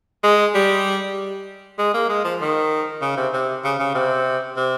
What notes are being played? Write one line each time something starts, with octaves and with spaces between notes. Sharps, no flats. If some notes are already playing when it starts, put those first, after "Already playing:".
G#3
G3
G#3
A#3
G#3
F3
D#3
C#3
C3
C3
C#3
C#3
C3
C3